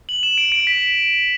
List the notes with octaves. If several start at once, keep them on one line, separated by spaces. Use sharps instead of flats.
F#7
E7
D7
D7
B6